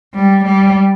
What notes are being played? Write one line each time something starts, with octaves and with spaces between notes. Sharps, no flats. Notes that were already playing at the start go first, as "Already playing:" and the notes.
G3
G3